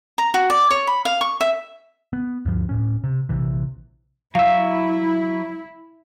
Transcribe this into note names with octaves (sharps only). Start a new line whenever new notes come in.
A#5
F#4
D5
C#5
B5
F5
C#6
E5
B3
D2 G2 F3
D1 A2 C#4
C3
A#1 C3 E3
F#3 E4 E5 F5